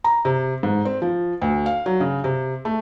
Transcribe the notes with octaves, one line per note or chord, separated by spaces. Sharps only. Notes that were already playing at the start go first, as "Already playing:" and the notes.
A#5
C3
G#2
C4
F3
D2
F5
F#3
C#3
C3
A3